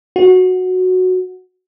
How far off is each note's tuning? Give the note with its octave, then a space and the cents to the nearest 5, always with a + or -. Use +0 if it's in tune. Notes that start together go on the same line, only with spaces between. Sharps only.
F#4 -5